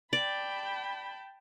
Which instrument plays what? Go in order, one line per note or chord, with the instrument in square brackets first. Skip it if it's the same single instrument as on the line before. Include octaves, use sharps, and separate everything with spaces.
[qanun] D5 [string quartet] G5 A5 B5